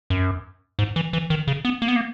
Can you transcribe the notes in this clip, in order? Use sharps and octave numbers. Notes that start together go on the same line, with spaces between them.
F#2
G#2
E3
E3
D#3
C#3
B3
A#3
B3
A#3